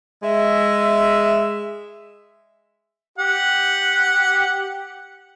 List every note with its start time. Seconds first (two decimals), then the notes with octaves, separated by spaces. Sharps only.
0.23 G#3 E5
3.18 G4 F#5